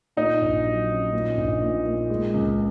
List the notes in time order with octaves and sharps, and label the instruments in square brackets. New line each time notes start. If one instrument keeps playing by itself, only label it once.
[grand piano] A#2 [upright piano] D#4
[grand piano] A#1
F#3
C#4
A#2
A#1
A#2
A#2
G#3
C#2